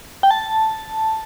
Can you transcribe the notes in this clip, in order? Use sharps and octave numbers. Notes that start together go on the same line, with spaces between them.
G5
A5